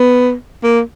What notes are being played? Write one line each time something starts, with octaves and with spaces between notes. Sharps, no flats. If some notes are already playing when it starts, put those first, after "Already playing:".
Already playing: B3
A#3